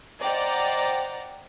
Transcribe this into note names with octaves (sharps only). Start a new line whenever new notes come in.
C5 D5 D#5 F#5 G5 A#5